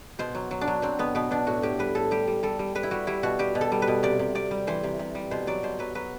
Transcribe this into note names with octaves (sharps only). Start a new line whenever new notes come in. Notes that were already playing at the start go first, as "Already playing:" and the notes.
B2 C5
F#3
F#3
D4
F#3
F#3 C4
B2 B3
B2 B3
B2 D4
A2 F#4
A2 G4
G3 B4
A2 A4
G3 G4
G3
G3 A4
G3
G3 B4
E4
G3 F#4
G3 E4
B2 F#4
G3 G4
B2
A4
G3
B4
B2
C3 D5
C3
C3 D5
G3
E3 C5
C3
C3
G3
B2 C5
F#3 D5
B2 C5
F#3 B4
F#3 B4